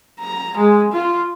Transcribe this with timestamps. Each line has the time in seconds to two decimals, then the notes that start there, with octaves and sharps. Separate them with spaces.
0.20 A#5
0.57 G#3
0.92 F4